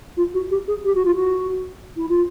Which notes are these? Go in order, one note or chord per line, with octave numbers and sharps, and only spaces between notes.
F4
F#4
G4
G#4
G4
F#4
F4
F#4
E4
F4